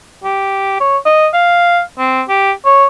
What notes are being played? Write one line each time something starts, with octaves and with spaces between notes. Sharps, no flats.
G4
C#5
D#5
F5
C4
G4
C#5